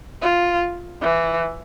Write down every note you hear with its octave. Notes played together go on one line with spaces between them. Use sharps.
F4
E3